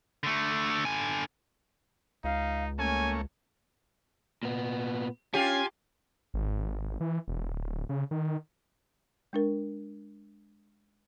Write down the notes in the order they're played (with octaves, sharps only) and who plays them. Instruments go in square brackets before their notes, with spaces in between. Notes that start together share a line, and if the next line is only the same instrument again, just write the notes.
[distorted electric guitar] D3 A3
D3 G#5
[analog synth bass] C#2 [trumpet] D#4 [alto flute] F5
[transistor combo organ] A3 A#3 C#5 [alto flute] C#4 [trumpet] G#5
[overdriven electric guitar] A#2 B3
[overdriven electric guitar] C#4 [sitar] F4 G4 [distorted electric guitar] G#5
[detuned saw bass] G#1
E3
E1
D1
C#3
D#3
[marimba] G#3 D4 A#4